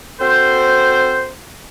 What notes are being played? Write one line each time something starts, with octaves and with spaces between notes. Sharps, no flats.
C4 F#4 A4 C5